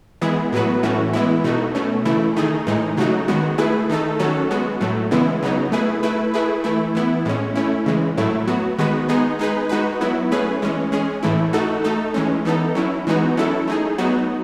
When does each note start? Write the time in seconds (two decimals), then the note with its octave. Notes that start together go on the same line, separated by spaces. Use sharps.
0.21 E3 G#3 B3 E4 G#4
0.52 A2 F#3 B3 F#4 B4
0.83 A2 E3 A3 C#4 F#4
1.13 E3 G#3 B3 E4
1.44 B2 A3 D#4 F#4
1.75 B2 A3 C#4
2.05 C#3 E3 A3 E4
2.36 D#3 A3 D#4 G#4
2.67 A2 E3 G#3 D#4
2.97 C#3 F#3 A3 D#4 F#4
3.28 D#3 G#3 B3 F#4
3.58 A3 E4 G#4 B4
3.89 D#3 A3 D#4 A4
4.19 D#3 F#3 C#4 F#4 A4
4.51 G#3 B3 F#4
4.81 A2 F#3 A3
5.11 C#3 E3 G#3 B3 E4
5.42 C#3 F#3 B3 D#4
5.72 A3 E4 G#4 B4
6.03 A3 E4 B4
6.34 A3 E4 G#4 B4
6.64 E3 A3 E4
6.95 E3 B3 E4
7.25 A2 G#3 C#4
7.55 A3 C#4 E4
7.86 C#3 E3 G#3
8.17 A2 F#3 A3 E4
8.48 F#3 B3 F#4
8.78 D#3 G#3 B3 F#4 B4
9.09 G#3 B3 D#4 G#4
9.39 G#3 D#4 G#4 B4
9.69 G#3 D#4 F#4 B4
10.01 F#3 B3 E4
10.31 A3 C#4 G#4 B4
10.62 E3 G#3 C#4
10.92 G#3 C#4 G#4
11.23 A2 E3 A3 E4
11.53 A3 D#4 F#4 A4
11.84 A3 D#4 A4
12.14 E3 G#3 C#4
12.45 E3 B3 D#4 A4
12.75 F#3 C#4 E4
13.07 E3 G#3 B3 D#4 F#4
13.37 F#3 C#4 E4 A4
13.68 A3 D#4 G#4
13.98 F#3 B3 D#4 F#4